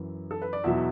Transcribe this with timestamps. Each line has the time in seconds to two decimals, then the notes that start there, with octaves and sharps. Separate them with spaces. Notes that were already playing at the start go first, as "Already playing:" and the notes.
Already playing: F#2 E3
0.31 A4
0.42 B4
0.53 D5
0.64 E2 B2 F#3 E5